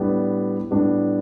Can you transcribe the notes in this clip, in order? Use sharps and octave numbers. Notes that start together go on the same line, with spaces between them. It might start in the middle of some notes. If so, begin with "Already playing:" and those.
Already playing: A2 G3 B3 D4
A2 G3 B3 D4